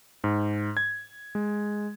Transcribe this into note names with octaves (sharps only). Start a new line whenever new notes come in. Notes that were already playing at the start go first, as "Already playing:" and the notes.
G#2
G#6
G#3